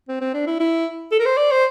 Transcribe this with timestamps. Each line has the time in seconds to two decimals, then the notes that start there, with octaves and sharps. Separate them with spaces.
0.08 C4
0.21 C4
0.34 D4
0.47 E4
0.60 E4
1.12 A4
1.20 A#4
1.26 C5
1.37 D5
1.51 C5